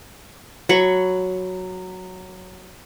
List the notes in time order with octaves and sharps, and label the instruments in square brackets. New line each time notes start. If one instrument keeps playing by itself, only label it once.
[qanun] F#3 B5 C#6